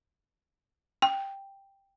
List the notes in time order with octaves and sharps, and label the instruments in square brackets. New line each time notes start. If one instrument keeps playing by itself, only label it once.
[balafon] G5